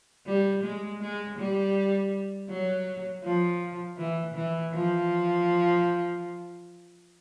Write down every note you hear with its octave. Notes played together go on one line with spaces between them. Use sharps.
G3
G#3
G#3
G3
F#3
F3
E3
E3
F3